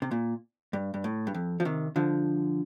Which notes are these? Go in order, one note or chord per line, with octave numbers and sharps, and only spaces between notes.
C3
A#2
G2
G2
A2
G2
F2
F3
C3 D#3
D3 F3